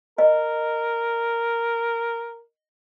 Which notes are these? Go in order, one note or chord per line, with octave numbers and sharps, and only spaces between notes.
A#4 D#5